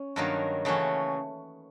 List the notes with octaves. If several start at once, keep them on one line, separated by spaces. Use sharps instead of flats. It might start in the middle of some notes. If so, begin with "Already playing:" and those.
Already playing: C#4
G2 D#3 F#3 A#3
C#3 E3 A3 C#4 F#4